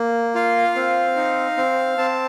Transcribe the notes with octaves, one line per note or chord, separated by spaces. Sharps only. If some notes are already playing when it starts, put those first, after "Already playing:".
Already playing: A#3
F4 F5
C4
D#4
C4
C4 A5